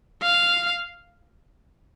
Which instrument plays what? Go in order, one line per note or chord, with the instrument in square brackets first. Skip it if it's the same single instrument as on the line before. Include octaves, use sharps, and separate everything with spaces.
[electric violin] F5